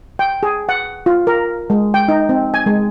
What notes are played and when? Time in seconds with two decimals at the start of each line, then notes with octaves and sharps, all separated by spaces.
0.19 G5
0.43 G#4
0.69 F#5
1.06 F4
1.27 A#4
1.70 G#3
1.94 G5
2.08 D#4
2.29 C4
2.54 G#5
2.66 G#3